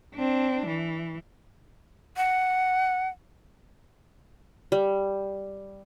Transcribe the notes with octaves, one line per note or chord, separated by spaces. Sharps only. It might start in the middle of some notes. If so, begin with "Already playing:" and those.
C4 D4
E3
F#5
G3